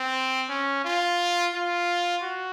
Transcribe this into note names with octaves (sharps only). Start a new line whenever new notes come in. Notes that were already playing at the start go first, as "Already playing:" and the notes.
Already playing: C4
C#4
F4
F4
F#4